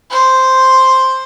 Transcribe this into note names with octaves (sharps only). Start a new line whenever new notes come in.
C5